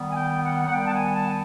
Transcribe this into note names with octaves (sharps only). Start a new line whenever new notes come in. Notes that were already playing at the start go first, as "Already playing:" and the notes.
Already playing: D#3 G3 B3
G#5
G5
F#5
F#5
D#3 G3 B3 G5
A5
G#5
A5